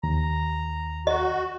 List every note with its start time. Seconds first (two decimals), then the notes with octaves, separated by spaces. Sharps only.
0.04 D#2 A#5
1.07 F#4 D#5